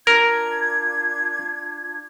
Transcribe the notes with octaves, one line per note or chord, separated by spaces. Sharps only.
D4 F4 A#4 G#6